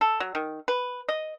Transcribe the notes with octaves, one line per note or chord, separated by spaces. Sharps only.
A4
F#3
D#3
B4
D#5